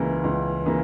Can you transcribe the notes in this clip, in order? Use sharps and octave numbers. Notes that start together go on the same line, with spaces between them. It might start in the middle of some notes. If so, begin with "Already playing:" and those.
Already playing: C#2 C#3 E3 A#3
C#2
C#3 E3 A#3